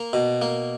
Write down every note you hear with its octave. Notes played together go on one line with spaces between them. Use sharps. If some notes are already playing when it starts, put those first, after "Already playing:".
Already playing: A#3 A#5
B2
A#3